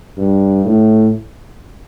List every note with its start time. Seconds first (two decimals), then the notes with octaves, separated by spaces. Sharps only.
0.18 G2
0.65 A2